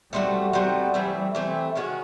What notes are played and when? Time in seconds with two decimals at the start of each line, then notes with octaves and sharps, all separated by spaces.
0.13 G3 A3 C4 D#4 F#4
0.53 G3 A3 C4 D#4 F#4
0.94 E3 A3 C4
1.35 E3 A3 C4
1.75 D#3 G#3 C#4 F#4